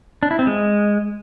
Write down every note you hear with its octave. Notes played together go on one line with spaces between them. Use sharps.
D4
E4
C4
G#3